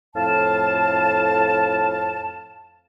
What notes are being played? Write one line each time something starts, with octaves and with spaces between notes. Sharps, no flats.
F2 A2 F5 A5